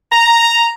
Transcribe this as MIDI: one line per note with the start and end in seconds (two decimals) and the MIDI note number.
0.12 0.69 82